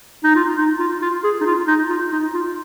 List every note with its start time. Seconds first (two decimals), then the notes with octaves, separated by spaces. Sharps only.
0.24 D#4
0.35 F4
0.58 D#4
0.79 F4
1.02 F4
1.24 G#4
1.41 D#4
1.46 F4
1.68 D#4
1.89 F4
2.12 D#4
2.34 F4